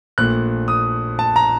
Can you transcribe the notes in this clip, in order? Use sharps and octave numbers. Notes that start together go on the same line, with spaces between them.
A#1 A#2 A3 F#6
D#6
A5
A#5